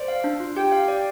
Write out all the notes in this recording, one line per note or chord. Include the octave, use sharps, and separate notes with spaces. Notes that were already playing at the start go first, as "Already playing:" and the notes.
Already playing: C5 D5
F5
D4
F4
G4 G5
F5
D5